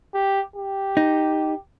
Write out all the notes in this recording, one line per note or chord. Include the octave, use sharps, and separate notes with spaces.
G4
G4
D#4